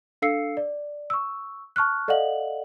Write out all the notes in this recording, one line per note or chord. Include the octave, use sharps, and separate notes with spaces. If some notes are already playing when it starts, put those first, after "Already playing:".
D4 A4 F5 E6 C7 C#7
D5
C#6 E6
A5 C#6 F6 F#6
A4 D5 D#5 F5 F#5 F#7